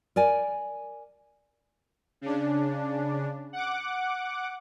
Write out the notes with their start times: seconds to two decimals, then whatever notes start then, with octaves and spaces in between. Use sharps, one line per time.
0.16 A#4 D5 G#5
2.21 C#3 D4
3.53 F#5 D6